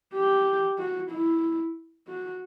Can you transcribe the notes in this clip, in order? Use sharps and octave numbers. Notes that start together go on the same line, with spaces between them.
G4
F#4
E4
F#4